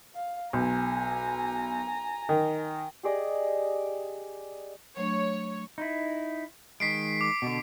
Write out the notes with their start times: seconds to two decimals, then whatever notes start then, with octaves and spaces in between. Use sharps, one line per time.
0.15 F5
0.53 B1 G#5 A#5
2.29 D#3
3.03 G4 G#4 D5 D#5
4.97 F#3 A3 D4 C#5
5.78 D#4 E4
6.80 D#3 G#3 B6 C7 D7
7.21 D6
7.42 B2 D3